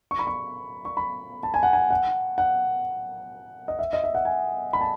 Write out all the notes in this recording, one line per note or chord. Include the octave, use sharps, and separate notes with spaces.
C#6
B5
C#6
C#6
B5
A5
G#5
F#5
G#5
F#5
F#5
D#5
E5
D#5
E5
F#5
G#5
B5
A5